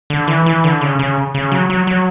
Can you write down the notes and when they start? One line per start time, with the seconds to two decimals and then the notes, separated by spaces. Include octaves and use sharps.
0.10 D3
0.28 E3
0.46 E3
0.64 D3
0.81 C#3
0.99 C#3
1.34 C#3
1.52 F#3
1.70 F#3
1.87 F#3